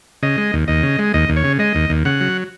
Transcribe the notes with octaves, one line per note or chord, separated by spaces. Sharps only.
C#3 D#5
G#3
D#2
D#2 D#5
C#3
G#3
D#2 D#5
D#2
C#5
C#3
G#3 D#5
D#2
D#2
C#3 F#5
F#3